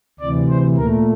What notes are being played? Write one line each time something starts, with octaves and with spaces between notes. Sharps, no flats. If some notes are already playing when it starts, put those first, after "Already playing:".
D2 C3 E3 D5
C5
A#2 A3 A#4